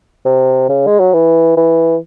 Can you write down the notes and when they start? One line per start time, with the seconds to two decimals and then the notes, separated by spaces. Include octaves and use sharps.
0.25 C3
0.69 C#3
0.86 G#3
0.99 F#3
1.13 E3
1.57 E3